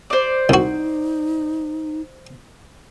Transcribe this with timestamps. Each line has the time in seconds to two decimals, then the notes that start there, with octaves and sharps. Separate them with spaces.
0.10 C5 D5
0.49 C2 D#4 F#4